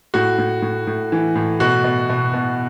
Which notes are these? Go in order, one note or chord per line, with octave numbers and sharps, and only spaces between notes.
A2 F#4
A2
A2
A2
E3
A2
B2 F#4
B2
B2
B2